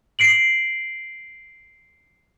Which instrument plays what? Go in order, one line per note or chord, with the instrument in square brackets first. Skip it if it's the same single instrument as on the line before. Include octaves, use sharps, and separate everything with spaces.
[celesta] C7 D7 F#7